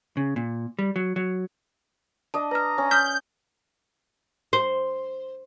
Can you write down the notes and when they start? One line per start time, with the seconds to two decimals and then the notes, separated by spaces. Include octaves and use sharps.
0.17 C#3
0.36 A#2
0.79 G3
0.96 F#3
1.16 F#3
2.34 D4 D#5 A5
2.51 B4 A#5 F6
2.78 C#4
2.91 D#6 F6 G6 B6
4.53 C5